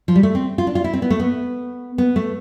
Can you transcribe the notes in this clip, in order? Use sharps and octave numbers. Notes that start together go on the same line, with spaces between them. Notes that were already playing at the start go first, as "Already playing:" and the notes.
F3
G3
A3
C4
F4
D4
F4
E4
C4
B3
A3
B3
B3
A3